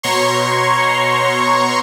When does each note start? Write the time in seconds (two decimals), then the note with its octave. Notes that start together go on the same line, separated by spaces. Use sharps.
0.03 B2 C#5 A#5 C6 C#6